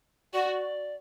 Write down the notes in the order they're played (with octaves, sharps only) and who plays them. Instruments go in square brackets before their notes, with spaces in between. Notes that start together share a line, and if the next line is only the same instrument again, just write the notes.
[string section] F#4 [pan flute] D5